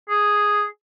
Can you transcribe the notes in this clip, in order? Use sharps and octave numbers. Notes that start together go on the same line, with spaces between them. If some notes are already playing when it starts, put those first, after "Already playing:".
G#4